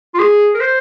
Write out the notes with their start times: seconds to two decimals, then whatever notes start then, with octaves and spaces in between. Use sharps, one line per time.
0.14 F4
0.19 G#4
0.54 A#4
0.60 C5